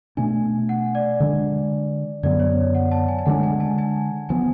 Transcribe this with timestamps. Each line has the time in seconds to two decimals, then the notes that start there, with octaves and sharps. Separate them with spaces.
0.17 B2 A3 D4 G#5
0.69 F#5
0.95 D5
1.20 D3 G#3 D4
2.23 F#2 D3 F#3 B3 D5
2.40 C#5
2.75 F#5
2.91 A5
3.08 G#5
3.18 G#5
3.26 D3 G#3 B3 D4 F#5
3.43 G#5
3.60 A5
3.78 G#5
4.29 F3 B3 G#5